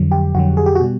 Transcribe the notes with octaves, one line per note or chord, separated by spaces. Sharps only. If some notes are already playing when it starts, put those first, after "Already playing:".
Already playing: F2 D3 F#3
G4
F2 D3 F#3 F#4
G#4
G4
F#4
B2 G3